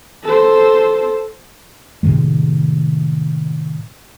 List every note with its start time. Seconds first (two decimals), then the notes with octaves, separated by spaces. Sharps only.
0.23 A4 C5
2.03 A2 C3 D#3 G#3